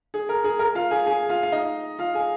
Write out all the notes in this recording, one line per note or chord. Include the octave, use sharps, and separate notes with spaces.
G#4
A#4
G#4
A#4
F4 F5
G#4 G#5
G#4 G#5
F4 F5
F5
D#4 D#5
F4 F5
G#4 G#5